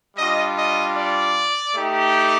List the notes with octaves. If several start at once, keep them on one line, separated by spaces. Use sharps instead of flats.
G3 D4 F4 D#5
D#5
D5
A3 D#4 G4